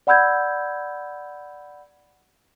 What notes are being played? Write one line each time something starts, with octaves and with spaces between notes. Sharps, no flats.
D5 F#5 B5 E6 G6 G#6